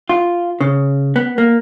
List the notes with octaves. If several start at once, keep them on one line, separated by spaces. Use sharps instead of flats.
F4
C#3
B3
A#3